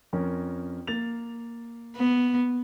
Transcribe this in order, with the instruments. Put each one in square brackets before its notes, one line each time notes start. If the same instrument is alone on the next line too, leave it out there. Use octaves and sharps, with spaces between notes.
[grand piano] F2 C#4 A#4
A#3 A6 F7
[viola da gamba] B3